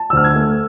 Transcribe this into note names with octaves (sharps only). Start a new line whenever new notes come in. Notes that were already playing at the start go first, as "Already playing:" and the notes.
Already playing: A5
E6
D2 F6
G#6
A3